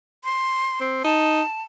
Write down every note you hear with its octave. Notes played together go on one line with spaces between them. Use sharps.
C6
C4
D#4 A5